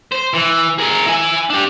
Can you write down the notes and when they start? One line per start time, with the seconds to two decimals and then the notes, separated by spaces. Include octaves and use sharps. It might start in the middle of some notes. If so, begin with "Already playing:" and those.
0.12 C5
0.34 E3
0.78 G#4 A#4
1.06 E4 G#5
1.50 D4 G4